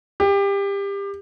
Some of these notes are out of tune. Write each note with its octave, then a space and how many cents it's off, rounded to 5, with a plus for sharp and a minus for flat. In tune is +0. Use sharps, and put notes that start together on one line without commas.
G4 +25